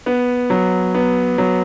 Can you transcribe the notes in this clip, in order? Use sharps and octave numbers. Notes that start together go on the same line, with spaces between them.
B3
F#3
B3
F#3